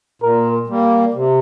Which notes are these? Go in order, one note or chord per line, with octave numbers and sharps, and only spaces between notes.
A#2 A#4
G3 A#3
C3